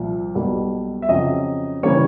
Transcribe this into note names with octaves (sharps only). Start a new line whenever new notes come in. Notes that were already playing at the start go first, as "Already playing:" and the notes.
Already playing: C2 A#2 F3
B1 B2 G3 A#3
E5
F2 C#3 F#3 D#5
C#3 E3 G3 A#3 C#5